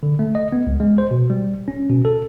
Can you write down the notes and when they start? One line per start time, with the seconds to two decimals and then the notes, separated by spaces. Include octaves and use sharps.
0.03 D3
0.19 A3
0.35 D#5
0.52 B3
0.67 C#2
0.80 G#3
0.98 C5
1.11 B2
1.30 G3
1.68 C#4
1.89 B2
2.05 A4